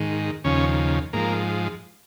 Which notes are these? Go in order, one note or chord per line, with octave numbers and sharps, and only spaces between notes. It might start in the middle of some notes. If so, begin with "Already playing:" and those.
Already playing: G#2 D#3
D#2 C#3 F3 C#4
G#2 F3 A#3